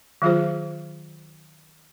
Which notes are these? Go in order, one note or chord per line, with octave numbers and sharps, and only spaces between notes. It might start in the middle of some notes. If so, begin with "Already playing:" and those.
D#3 F#3 F4 G#4 C5